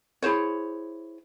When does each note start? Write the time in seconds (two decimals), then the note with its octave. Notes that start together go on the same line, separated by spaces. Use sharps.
0.22 E4 G#4 C5 C#5